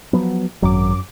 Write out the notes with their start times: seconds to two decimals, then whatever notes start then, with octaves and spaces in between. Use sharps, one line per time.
0.13 F3 F#3 B3
0.62 G#1 F#2 F#3 D6